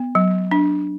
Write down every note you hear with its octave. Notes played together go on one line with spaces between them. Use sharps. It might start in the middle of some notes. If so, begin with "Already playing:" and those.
Already playing: B3
F#3
D4